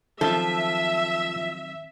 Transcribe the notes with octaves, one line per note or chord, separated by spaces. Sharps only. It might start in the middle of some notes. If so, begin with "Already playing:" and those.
D#3 F3 F#3 C4 A4 E5